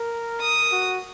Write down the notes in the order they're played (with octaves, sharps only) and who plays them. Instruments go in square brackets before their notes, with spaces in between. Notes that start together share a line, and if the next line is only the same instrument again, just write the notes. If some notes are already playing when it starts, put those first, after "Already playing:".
Already playing: [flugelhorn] A#4
[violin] D#6
[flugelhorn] F#4